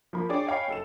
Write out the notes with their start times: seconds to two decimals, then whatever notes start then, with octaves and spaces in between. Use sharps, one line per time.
0.13 F3 A#3 B5
0.29 D4 G#4 C#5 D5 G5 D6
0.47 C#5 D#5 F5 G5 G#5 B5
0.68 F#1 A4 E7